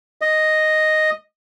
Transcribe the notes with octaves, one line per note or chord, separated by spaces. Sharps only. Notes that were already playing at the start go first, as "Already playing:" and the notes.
D#5